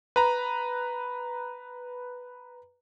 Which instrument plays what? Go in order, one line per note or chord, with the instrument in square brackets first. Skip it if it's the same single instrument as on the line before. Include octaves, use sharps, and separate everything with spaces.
[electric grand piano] B4 A#5